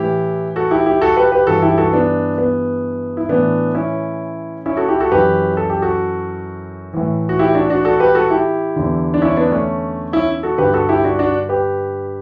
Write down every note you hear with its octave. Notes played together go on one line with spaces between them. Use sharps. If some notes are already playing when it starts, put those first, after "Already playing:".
Already playing: A2 E3 E4 G4
F#4 A4
E4 G4
E4 G4
F#4 A4
G4 B4
G4 B4
G2 E3 F#4 A4
E4 G4
F#4 A4
B3 D4
B3
E4
A2 E3 B3 D4
C#4 E4
C#4 E4
F#4 A4
E4 G4
F#4 A4
F#2 E3 G4 B4
A4
G4
F#4 A4
A2 E3
F#4
E4 G4
D4 F#4
D4 F#4
F#4 A4
G4 B4
F#4 A4
E4 G4
E2 D3
D4
C#4 E4
B3 D4
A3 C#4
C#4 E4
F#4 A4
G2 D3 G4 B4
F#4 A4
E4 G4
D4 F#4
D4 F#4
G4 B4